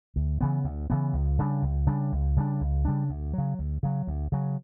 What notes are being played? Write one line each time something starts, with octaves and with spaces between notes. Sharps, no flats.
D2
C#3 E3 B3
D2
C#3 E3 B3
C#2
C#3 G3 D4
C#2
C#3 G3 D4
C#2
C#3 G3 D4
C#2
C#3 G3 D4
D2
C#3 F#3
D2
C#3 F#3
D2
C#3 F#3